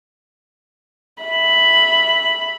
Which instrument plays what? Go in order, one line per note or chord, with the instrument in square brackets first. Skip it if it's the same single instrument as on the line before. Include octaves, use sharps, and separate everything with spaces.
[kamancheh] E5 B5